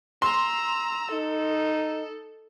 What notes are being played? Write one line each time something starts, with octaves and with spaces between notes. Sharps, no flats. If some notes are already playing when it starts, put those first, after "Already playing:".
A#5 C6 E6
D#4 A4